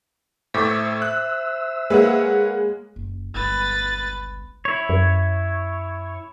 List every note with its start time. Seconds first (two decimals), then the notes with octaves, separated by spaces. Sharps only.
0.54 A2 C5 E5 C#6 D6 E6 A6
1.02 F#6
1.90 G#3 A#3 B4 C#5 F#5
2.96 F#1
3.35 G1 C#2 B4 A6
4.65 E4 C#5
4.89 F#2